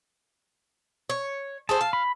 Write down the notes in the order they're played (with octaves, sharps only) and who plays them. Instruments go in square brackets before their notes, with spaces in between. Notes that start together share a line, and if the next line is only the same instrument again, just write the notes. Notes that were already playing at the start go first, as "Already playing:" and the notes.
[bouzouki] C#5
[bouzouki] G#4 A4 C5 [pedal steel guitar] A5
[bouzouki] F5
[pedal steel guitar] B5